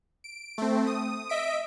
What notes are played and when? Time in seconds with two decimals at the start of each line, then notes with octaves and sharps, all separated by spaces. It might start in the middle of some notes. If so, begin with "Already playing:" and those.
0.24 D7
0.58 A3 C4
0.87 D#6
1.29 D#5 E5 B6 D7